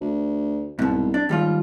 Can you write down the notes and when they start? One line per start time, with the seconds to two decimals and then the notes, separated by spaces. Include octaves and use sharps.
0.01 D2
0.79 C2 G#2 B2
1.14 D4
1.29 D#2 G#2 G3 F4